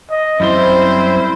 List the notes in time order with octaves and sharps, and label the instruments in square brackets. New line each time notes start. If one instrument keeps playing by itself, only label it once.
[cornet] D#5
[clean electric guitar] F#2 G3 C6 [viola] C4 C5 [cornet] E4